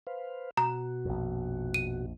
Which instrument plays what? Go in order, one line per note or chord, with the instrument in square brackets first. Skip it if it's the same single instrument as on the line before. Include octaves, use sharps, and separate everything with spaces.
[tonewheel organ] B4 C5 F5
[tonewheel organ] B2 F#4 [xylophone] A#5
[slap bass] A#1 F2
[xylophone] D#7